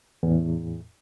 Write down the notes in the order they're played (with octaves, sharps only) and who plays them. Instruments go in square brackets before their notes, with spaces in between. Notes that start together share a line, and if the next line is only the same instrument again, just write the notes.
[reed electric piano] E2 A2